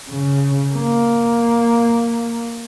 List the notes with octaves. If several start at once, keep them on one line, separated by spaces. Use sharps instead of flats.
C#3
A#3